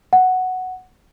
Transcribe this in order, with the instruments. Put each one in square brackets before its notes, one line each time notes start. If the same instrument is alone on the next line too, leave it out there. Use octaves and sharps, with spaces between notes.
[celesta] F#5